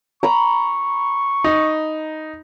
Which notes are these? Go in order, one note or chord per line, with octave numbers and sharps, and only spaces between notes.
A#5 B5 C#6
D#4